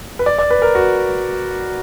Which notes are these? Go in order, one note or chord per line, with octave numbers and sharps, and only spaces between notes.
B4
D5
D5
B4
A#4
F#4